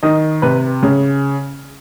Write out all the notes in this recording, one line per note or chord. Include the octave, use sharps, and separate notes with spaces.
D#3 D#5
C3 B4
C#3